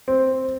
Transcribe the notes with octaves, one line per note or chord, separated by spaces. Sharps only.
C4